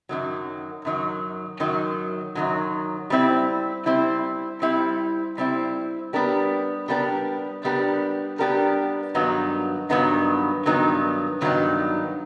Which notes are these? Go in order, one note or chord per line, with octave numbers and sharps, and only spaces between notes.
F#2 D#3 F#3
F#2 D#3 F#3
F#2 D#3 F#3
F#2 D#3 F#3
G3 C4 E4
G3 C4 E4
G3 C4 E4
G3 C4 E4
G3 B3 D4 G4 A#4
G3 B3 D4 G4 A#4
G3 B3 D4 G4 A#4
G3 B3 D4 G4 A#4
G2 D#3 F#3 B3 D#4
G2 D#3 F#3 B3 D#4
G2 D#3 F#3 B3 D#4
G2 D#3 F#3 B3 D#4